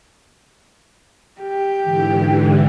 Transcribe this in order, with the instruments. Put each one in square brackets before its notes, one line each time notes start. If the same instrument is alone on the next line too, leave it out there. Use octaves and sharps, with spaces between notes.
[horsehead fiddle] G4
[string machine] G#2 D3 E3